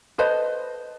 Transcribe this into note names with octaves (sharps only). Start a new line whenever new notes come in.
A4 B4 C5 D#5